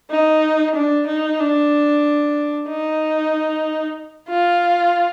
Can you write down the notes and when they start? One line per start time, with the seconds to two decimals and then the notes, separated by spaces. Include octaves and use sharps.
0.11 D#4
0.75 D4
1.07 D#4
1.39 D4
2.68 D#4
4.29 F4